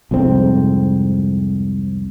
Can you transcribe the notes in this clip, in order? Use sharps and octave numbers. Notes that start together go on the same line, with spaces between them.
C2 F2 G#2 C4